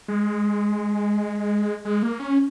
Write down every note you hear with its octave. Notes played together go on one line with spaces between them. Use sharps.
G#3
G#3
A#3
C#4